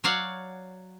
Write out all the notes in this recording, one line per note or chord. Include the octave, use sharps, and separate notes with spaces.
F#3 C#5 D5 F5 F#5